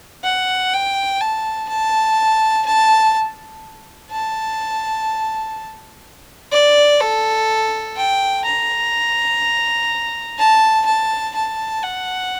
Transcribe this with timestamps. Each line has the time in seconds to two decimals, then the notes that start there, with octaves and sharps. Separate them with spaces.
0.24 F#5
0.73 G5
1.21 A5
1.69 A5
2.66 A5
4.11 A5
6.52 D5
7.00 A4
7.97 G5
8.45 A#5
10.39 A5
10.86 A5
11.35 A5
11.83 F#5